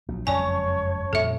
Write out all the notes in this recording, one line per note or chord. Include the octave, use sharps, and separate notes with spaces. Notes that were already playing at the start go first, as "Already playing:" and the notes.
A#1 F#3
F#1 F2 G#3 C#4 C#5 D5 G#5 A5
F2 A#2 G3 A4 E5